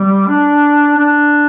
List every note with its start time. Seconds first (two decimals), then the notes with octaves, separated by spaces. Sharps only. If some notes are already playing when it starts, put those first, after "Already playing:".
Already playing: G3
0.28 D4
0.97 D4